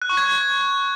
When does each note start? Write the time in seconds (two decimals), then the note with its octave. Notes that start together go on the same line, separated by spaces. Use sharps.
0.02 F#6
0.09 C#6
0.17 G#6